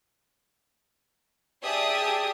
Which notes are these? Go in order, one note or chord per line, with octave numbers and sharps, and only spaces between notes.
G4 G#4 D5 E5 A5 D#6